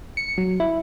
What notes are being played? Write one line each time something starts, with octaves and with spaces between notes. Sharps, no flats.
C#7
F#3
E4